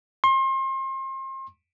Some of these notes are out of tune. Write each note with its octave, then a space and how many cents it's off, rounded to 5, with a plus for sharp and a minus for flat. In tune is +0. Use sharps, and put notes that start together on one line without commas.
C6 +35